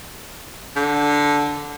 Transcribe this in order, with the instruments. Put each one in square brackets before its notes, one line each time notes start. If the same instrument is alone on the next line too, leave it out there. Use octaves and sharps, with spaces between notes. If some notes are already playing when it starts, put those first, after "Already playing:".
[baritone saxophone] D3